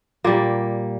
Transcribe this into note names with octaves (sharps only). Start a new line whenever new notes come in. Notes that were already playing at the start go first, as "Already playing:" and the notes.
A#2 G3 A#3